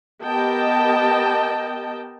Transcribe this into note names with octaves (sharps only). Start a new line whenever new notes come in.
B3 G4 A#4 D#5 G5 A5